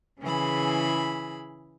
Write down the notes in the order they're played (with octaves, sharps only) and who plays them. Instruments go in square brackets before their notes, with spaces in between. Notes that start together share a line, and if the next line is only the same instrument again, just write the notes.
[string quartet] C#3 E3 E4 G#4 B5